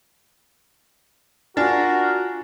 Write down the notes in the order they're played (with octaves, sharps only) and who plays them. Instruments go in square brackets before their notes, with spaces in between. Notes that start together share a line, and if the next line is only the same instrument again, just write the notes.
[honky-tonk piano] D4 [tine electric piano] F4 G#5 A6 [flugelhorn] F#4 [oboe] A#4